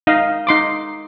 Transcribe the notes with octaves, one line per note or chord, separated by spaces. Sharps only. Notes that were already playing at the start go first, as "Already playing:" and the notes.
D#4 D#5 F5
D#4 C6 D6